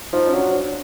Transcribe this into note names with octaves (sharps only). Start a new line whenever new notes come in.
F3 D#4
C#4
F#3 D4
D4